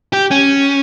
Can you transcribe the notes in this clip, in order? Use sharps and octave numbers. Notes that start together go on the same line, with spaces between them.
G4
C#4